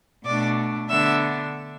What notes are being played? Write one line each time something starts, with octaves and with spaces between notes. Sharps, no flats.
B2 A3 D4 D5 D6
D3 B3 D4 E5 E6